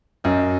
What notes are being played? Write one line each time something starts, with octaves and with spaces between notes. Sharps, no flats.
F#2 D#5